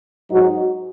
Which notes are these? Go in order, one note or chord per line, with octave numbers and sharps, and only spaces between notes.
G#2 F#3 D#4 F#4